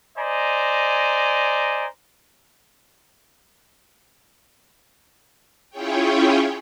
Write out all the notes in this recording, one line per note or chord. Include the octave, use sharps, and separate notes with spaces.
C5 D5 D#5 G#5 A#5
C#4 E4 F4 G#4 C#5 G5